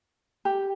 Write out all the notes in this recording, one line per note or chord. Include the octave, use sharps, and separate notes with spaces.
G4